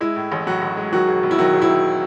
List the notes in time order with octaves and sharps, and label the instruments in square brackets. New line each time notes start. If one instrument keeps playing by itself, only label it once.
[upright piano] G#3 E4
A2
A1
A2 F#3 F#4
A1
G#3
D#3 F#3 F#4
E1
E1
E4
D#3 F#3 F#4
E1
E4
D#3